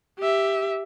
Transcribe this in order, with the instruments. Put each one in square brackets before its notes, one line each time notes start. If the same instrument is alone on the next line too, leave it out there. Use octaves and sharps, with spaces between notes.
[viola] G4 E5